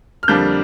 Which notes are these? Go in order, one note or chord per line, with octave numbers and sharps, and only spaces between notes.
F6
F2 D3 G3 A#3 D4 G6